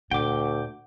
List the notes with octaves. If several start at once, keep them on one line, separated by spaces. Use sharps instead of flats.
D2 A#2 F#5 G5 D6